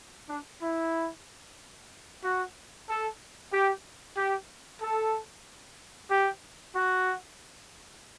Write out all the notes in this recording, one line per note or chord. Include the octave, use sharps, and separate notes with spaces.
D4
E4
F#4
A4
G4
G4
A4
G4
F#4